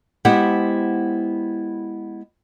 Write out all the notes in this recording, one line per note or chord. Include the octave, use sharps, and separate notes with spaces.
G#3 B3 E4 G4 C5 F#5